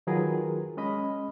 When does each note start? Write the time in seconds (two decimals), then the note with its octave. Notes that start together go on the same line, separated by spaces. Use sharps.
0.07 D#3 F#3 F4 G#4 A#4 B4
0.77 G#3 C#4 D#5 B5